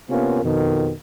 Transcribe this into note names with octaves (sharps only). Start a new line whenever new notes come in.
C3 A#3 B3 C#4 F4 A#4
F2 B2 D#3